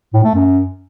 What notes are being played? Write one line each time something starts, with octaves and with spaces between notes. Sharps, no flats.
A2
A3
F#2